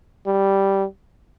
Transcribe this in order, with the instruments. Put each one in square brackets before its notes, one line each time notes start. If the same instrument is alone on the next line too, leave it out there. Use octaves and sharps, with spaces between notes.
[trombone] G3